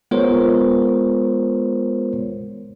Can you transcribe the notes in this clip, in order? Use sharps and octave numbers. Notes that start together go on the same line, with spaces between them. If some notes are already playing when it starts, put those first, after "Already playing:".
G#3 B3 F4 A#4 C5 C#5